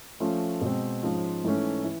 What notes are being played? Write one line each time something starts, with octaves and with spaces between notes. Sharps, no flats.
F3 A3 C#4 F4
B2 G#3 C4
G#2 F3 G#3 C#4 F4
G#2 E3 A3 C#4
E3